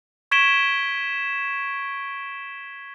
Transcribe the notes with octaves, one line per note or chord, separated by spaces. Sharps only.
C#6 G#6 B6 D7 E7 G7